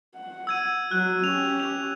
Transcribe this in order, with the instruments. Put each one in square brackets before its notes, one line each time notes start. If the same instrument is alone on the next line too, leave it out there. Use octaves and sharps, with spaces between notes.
[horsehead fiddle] F#5
[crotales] E6 G#6 D#7
[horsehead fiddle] F#3 [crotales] F#6
[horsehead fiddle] C#4 G4 [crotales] F7
[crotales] F7